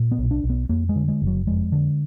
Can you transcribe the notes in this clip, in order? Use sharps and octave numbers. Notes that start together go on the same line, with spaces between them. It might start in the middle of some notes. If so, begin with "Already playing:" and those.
Already playing: A#2
B3
B1
D4
B1
B3
F2 A#3
G#3
D3
G#3
F#1
F#3
F2 G#3
D3